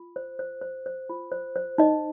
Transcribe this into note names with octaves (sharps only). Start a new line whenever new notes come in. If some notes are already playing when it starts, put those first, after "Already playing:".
Already playing: F4
C5
C5
C5
C5
F4
C5
C5
D#4 D#5